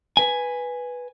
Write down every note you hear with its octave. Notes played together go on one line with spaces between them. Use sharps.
B4 G#5